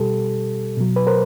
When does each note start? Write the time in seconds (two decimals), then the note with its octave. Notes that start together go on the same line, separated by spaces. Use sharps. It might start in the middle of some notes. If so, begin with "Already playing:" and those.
Already playing: B2 G3 G4 A4
0.77 B2 F#3
0.96 B4
1.07 A#4 C5